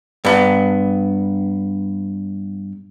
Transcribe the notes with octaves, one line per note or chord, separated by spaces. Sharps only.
G2 B3